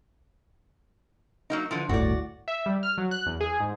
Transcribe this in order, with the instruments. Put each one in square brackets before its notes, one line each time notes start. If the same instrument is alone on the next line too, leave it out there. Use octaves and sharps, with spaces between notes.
[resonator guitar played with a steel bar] F#3 A#3 D#4
D3 E3 F3
[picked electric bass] G1 D2 A2 [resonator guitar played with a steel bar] F#4 D5
[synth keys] E5
G3
F6
F#3
F#6
E2
G#4
G#2